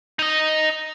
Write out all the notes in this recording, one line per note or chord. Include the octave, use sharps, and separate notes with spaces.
D#4 D#5